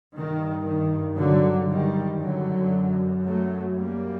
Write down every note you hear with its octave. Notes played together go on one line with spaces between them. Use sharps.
G2 D#3
D#3
D3 F#3
D#3 G3
F#2 D3 F#3
F#3 A3
G3 A#3